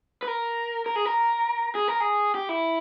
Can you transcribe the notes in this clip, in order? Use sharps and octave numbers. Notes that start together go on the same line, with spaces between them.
B4
A#4
A#4
G#4
A#4
G#4
A#4
G#4
G4
E4